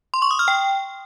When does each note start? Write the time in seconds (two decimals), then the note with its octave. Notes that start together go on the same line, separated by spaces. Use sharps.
0.14 C6
0.22 C#6
0.31 D#6
0.39 F6
0.48 G5